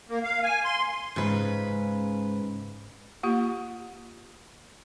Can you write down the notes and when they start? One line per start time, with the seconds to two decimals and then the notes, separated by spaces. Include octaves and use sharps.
0.09 A#3
0.24 F5
0.43 G#5
0.64 C6
1.16 G#2 C#3 B4
3.23 A#3 F4 G4